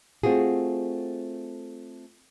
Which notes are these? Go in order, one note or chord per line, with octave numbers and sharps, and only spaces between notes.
A3 C4 F4 F#4 G#4